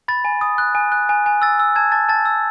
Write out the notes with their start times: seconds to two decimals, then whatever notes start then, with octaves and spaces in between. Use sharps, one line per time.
0.08 B5 A6
0.25 G#5
0.41 D#6
0.58 F#6
0.75 G#5
0.92 F#6
1.09 G#5
1.26 G#5
1.42 E6 A6
1.59 E6
1.76 A5 G#6
1.92 A5 A6
2.09 A5 A6
2.25 E6